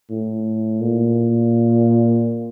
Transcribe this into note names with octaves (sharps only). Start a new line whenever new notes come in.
A2
A#2